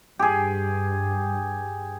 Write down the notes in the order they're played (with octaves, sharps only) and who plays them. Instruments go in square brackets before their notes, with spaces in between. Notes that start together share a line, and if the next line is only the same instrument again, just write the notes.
[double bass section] G2 [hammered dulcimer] G4 G#4